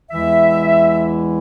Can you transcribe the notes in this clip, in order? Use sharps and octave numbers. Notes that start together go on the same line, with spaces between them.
E2 E3 G#3 E4 E5